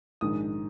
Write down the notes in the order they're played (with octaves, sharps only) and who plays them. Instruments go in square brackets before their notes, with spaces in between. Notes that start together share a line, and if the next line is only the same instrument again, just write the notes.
[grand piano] A#1 G#2 D#3 G#3 D#6